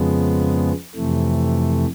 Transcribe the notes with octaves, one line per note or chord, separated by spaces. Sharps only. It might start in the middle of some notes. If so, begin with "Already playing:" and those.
Already playing: F2 C#3 F3 G#3 B3
F2 C3 E3 A3